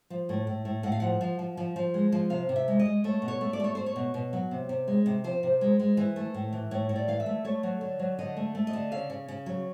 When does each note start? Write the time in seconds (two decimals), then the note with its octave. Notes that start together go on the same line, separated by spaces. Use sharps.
0.10 F3
0.29 A2
0.47 A2
0.65 A2
0.83 A2 F#5
0.92 F5
1.00 F3 F#5
1.21 F3
1.39 F3
1.57 F3
1.76 F3
1.94 G#3
2.12 F3
2.30 C3 F5
2.49 C3
2.56 E5
2.68 G#3
2.79 D#5
2.86 G#3
3.04 A3 C#5
3.22 B2
3.28 C#5
3.41 A3
3.53 D5
3.60 A3 C#5
3.75 A3 C5
3.86 C#5
3.96 B2
4.14 B2
4.33 F#3
4.51 C3
4.69 C3
4.88 G#3
5.06 C3
5.24 F3 C5
5.43 C3
5.61 G#3
5.79 G#3
5.97 E3
6.16 A3
6.34 A2
6.53 E3
6.71 A2 C#5
6.89 A2
6.96 D5
7.08 E3 F5
7.20 E5
7.26 A3
7.45 A3 C#5
7.63 F#3
7.81 D3
7.99 F#3
8.19 D3 D#5
8.37 A3
8.55 A3
8.67 D#5
8.73 D3
8.92 C#3 F5
9.10 C#3
9.28 C#3
9.46 F#3